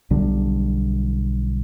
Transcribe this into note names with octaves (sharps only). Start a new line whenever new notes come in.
B1 D3 G3